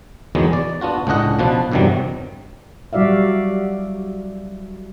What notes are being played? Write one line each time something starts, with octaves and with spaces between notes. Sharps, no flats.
E2 D#3 F#3 G#3 B3
D5
B3 D4 F4 F#4
C#2 A2 D4 D#5 F#5
B2 F3 D4 B4
E2 G2 C3 D#3 F#3 G3
F#3 G3 F#4 D5 E5 F5